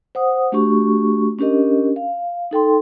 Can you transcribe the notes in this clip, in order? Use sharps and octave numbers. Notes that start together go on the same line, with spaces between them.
C5 F#5 D#6
A3 D4 F#4 G4 C#6
C#4 D4 G4 A#4 D#5
F5
D#4 A4 G5 C6